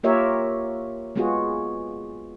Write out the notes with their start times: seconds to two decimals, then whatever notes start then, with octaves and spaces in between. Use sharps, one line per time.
0.03 A#3 F4 G4 A#4 C#5 E5
1.16 G#3 B3 F4 F#4 G#4